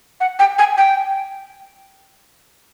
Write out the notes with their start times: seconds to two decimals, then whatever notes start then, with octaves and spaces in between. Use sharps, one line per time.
0.20 F#5
0.39 G5
0.58 G#5
0.78 G5